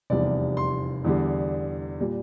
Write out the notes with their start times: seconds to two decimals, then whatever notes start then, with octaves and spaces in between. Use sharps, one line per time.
0.10 F1 E2 C3 G3 D5
0.57 C6
1.04 E2 D3 G3
2.00 A#2 G3